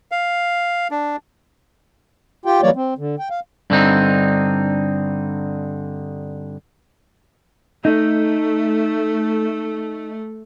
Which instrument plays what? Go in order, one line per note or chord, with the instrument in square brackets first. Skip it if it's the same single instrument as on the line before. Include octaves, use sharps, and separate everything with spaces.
[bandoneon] F5
D4
[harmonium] F4 G4 G5
E3 F#3 G3 A#3 C#5 D5
C4
D3
G5
F5
[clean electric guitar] G2 D3 C4 D#4
[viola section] A3 [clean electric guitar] D#4